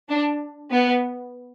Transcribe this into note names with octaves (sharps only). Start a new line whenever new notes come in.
D4
B3